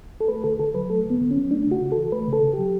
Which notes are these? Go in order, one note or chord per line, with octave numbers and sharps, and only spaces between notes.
A4
A3 B4
D3 A4
D3 A4
F#3 B4
A3 A4
D3 B3
D3
F#3 C#4
A3 D4
C#3 F#4
C#3
A4
E3
A3 B4
C#3
A4
C#3
F#3 G4